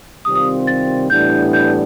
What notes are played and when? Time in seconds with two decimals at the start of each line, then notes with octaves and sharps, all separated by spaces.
0.25 C3 D#3 G3 C4 F4 D#6
0.36 D#6
0.67 A6
1.10 A2 E3 G3 B3 D4 G6
1.53 G6